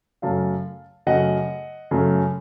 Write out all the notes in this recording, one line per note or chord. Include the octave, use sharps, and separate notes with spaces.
F#2 C#3 A3 F5 A5
F#2 C#3 A3 D#5 F#5
F#2 C#3 A3